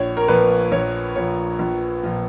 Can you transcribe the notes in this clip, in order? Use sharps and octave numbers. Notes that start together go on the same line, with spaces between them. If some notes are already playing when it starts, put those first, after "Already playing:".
Already playing: A#1 C#5
A#4
A#2 F3 B4
A#1 C#5
A#2 F3 C#5
A#1
A#2 F3